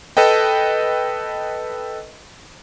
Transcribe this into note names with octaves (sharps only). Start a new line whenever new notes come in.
A4 B4 D#5 G5